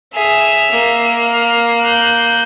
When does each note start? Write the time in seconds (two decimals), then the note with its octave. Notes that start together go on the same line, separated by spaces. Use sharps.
0.15 G#4 E5 F7
0.72 A#3
1.26 F6
1.82 F#6 G6